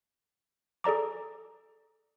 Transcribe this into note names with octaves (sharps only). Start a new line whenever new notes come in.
G#4 A4 D5 A#5 D6